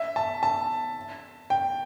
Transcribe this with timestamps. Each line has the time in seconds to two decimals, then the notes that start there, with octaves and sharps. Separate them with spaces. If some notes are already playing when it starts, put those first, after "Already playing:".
Already playing: E5
0.16 A5
0.43 A5
1.50 G5